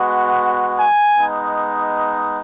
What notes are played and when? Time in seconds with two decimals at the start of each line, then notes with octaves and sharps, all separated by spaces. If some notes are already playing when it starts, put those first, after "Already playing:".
Already playing: G#3 B3 F#4
0.79 G#5
1.18 G#3 B3 D#4